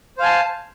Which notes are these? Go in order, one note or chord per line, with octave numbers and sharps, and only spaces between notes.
C5 F5 G#5 A5